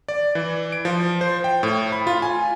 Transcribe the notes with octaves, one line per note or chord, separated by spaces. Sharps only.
D5
E3
D7
F3
C5
G5
A2
B5
F4
G#5